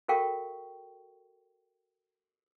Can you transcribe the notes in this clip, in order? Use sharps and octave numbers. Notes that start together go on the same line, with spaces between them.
F#4 A4 A#4 F5 G5 C#6